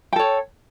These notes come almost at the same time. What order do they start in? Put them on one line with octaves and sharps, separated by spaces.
G5 A4 C#5